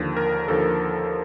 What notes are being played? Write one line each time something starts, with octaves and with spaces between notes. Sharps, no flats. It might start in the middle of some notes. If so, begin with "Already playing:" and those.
Already playing: D#2 D3 F3
A#4
D#2 D3 F3 A4